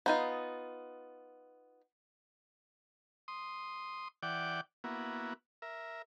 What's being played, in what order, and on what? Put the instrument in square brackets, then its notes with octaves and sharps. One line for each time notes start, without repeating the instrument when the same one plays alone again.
[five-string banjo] B3 D#4 F4
[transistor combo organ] C6 D#6
E3 D5 F#5 G5 D6
A#3 B3 E4 F#4
A#4 E5